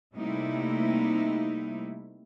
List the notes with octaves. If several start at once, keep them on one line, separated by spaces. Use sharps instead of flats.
C3 G3 A3 A#3 D#4 E4